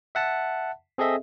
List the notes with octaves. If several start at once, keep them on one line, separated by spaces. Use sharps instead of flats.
E5 F#5 A5
C4 G#4 A4 D#5 E5